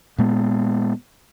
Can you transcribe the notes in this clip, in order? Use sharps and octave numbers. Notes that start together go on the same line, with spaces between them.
A#2 G#3 B3